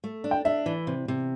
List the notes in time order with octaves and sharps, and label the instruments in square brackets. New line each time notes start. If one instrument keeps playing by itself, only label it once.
[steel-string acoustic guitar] A3
D4
[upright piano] G5
[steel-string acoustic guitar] D4 [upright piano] E5
[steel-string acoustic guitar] E3
C3
C3